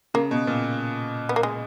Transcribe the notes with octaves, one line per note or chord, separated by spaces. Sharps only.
C#3 A#3
B2
A#2
B3
A#3
G#3